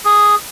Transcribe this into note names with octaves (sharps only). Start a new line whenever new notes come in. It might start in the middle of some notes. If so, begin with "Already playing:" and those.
G#4